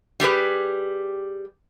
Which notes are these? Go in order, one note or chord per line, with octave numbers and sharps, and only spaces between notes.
G3 G4 G#4 B4